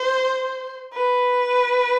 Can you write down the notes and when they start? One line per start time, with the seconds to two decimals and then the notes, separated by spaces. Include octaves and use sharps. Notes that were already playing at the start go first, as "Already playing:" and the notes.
Already playing: C5
0.94 B4